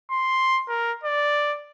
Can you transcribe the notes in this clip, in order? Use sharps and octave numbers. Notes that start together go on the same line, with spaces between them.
C6
A#4
D5